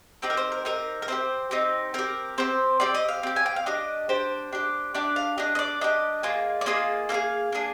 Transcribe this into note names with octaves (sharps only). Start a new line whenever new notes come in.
C4 D#4 G4 D5
A#4
C5
A#4
C4 D#4 G4 A#4
A#4
C4 D#4 G4 C5
C4 D#4 G4
C4 G4 A#4
C4 G4 C5
C4 G4 D5
D#5
F5
C4 G4
G#5
G5
F5
D4 G4 D#5
D4 G4 C5
D4 G4
D4 G4 D5
F5
D4 G4 D#5
D#5
D5
D4 G4 D#5
A#3 F4 G#4
D5
A#3 F4 G#4 D#5
A#3 D4 G#4 F5
A#3 D4 G#4